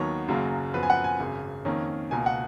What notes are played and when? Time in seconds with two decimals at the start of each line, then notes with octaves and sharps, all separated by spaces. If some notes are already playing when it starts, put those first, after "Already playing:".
Already playing: D#2 D#3 F#3 B3 C#5
0.28 F#1 F#2 C#3 F#3 A#3
0.74 F#2 F3 B3 B4
0.83 G#5
0.90 F#5
1.04 G#5
1.20 G#1 F#2 C#3
1.65 F2 D#3 A#3 C#4
2.11 C#2 B2 A#3 G#5
2.26 F#5